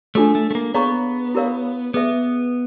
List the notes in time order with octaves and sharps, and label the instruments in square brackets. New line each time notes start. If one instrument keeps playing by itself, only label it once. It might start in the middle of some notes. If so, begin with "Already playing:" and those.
[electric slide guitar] A3 [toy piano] D4 F4 A4 C#5
[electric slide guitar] A3
A3
A#3
[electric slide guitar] B3 [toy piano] G#4 C#5 F5 A#5 C#6
[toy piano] E4 G4 A#4 C#5 F5
[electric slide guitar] B3 [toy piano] G#4 B4 E5